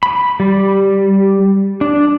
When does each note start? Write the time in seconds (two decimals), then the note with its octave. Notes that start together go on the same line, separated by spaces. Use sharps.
0.03 B5
0.40 G3
1.81 D4